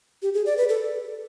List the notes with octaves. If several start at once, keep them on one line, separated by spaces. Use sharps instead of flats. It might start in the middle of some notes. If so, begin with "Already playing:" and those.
G4
G#4
D5
B4
A4